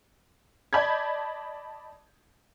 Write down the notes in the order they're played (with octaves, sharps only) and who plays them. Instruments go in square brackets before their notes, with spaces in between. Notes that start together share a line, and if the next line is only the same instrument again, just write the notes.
[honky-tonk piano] D5 D#5 A5 B5 G6 G#6